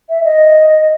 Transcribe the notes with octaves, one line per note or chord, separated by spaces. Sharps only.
E5
D#5